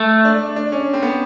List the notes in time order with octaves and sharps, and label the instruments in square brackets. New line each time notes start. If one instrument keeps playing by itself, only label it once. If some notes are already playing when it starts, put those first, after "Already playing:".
Already playing: [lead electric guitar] A3
[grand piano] D4
D4
C#4
C4
B3